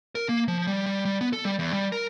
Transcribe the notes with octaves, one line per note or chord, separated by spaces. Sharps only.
A#4
A#3
F3
G3
G3
G3
B3
A4
G3
E2
G3
A#4